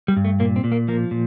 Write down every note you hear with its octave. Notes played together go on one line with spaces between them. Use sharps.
G3
G2
A3
A#2 A#3
C4
A#2
A#3
F3 A#3
A#2